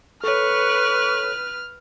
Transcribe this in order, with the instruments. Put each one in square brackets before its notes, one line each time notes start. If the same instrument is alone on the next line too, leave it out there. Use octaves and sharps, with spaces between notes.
[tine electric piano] A4 C#5 [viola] B4 [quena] C#6 [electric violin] F6